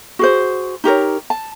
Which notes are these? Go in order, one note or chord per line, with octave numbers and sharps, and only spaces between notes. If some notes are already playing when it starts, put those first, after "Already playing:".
F#4 G#4 C5
D#4 G4 A#4 C#5
A5